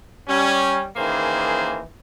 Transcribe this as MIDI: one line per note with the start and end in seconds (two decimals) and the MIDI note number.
0.28 0.86 55
0.28 0.86 61
0.96 1.81 51
0.96 1.81 52
0.96 1.81 58
0.96 1.81 61
0.96 1.81 68
0.96 1.81 72